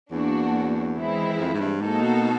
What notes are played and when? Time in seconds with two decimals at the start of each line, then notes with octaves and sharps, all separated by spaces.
0.11 E2 A#3 D4 F#4
0.96 E3 G#3 C4 E4
1.38 F2
1.54 G#2
1.60 G2
1.81 G#2 A#3 D#4 F#4 A4
2.02 B2